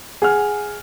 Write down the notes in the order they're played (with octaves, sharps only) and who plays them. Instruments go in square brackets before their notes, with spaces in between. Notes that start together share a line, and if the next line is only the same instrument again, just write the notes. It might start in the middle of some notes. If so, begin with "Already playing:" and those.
[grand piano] G#4 F#5 F6